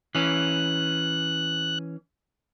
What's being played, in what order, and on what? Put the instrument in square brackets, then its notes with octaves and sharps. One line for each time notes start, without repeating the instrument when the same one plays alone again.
[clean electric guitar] E3 C#4 [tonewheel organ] F#6